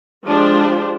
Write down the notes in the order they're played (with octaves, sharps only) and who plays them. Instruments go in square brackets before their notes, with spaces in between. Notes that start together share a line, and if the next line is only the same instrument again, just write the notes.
[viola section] F3 G#3 D4 G4 C5